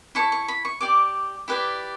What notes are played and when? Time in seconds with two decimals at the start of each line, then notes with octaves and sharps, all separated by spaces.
0.15 E4 A4 C#5 C#6
0.32 C#6
0.48 B5
0.65 C#6
0.81 G4 D5 D6
1.48 E4 G4 B4 D5